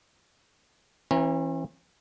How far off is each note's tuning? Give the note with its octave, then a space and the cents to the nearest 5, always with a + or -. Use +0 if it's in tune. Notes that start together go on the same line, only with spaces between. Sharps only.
E3 +0 C#4 -45 A#5 +25